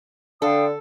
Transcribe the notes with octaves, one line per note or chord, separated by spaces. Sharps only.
D3 A4 F5 G5 D#6